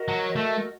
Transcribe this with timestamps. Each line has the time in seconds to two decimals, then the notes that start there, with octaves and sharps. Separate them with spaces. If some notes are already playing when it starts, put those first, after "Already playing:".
Already playing: F#4 A#4 D#5
0.08 F#3
0.36 A3